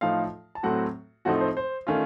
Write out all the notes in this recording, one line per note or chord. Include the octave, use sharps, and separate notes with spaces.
A2 F3 A3 D#4 F4 F5
A5
A2 F#3 A3 C4 F#4 F#5
A2 F3 A3 C4 D#4 F#4 F#5
C5
C5
D#3 A3 C#4 F4